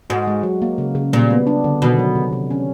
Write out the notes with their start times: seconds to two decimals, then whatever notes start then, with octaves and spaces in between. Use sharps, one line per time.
0.10 G#2 F#4
0.27 G#3
0.43 F#3
0.62 A#3
0.78 C#3
0.95 C#3
1.13 A#2 G3
1.30 B3
1.47 D4
1.64 D3
1.82 B2 D#3
1.99 F#3
2.15 C3
2.33 C3
2.50 C#4